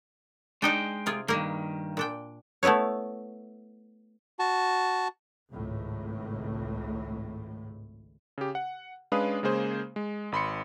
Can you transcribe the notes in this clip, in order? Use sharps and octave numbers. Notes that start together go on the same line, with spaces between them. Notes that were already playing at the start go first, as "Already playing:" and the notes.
G#3 D4 D#4 D#5 G5
C3 F4 G#4
G2 D#3 A#3 A#4
A#2 D4 G5
A3 B3 E4 B4 C#5
F#4 A5
G#1 C#2 A2
C#3 G4
F#5
G#3 C#4 D4 B4 F5 D#6
C#3 G#3 A#3 G#4 C5
G#3
G#1 B5 C6 C#7